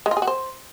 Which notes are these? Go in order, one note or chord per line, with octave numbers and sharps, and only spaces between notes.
G#3
F4
G#4
F#4
C5